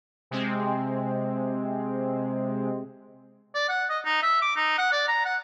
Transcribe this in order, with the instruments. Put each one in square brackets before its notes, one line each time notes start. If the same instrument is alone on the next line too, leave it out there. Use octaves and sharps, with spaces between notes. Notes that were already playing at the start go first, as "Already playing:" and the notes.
[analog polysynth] C3 G#3 C4
[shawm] D5
F#5
D#5
D#4
E5
D6
D#4
F#5
D5
A#5
F#5